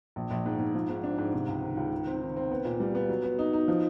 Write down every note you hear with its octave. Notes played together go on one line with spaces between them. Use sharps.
A#1
A#1
G#2
G#2
F3
G#2
D4
G#2
C3
C#2
D#3
C#2
D#3
C4
D#3
C4
B3
A#2
G3
B3
F#3
B3
D#4
D#4
F3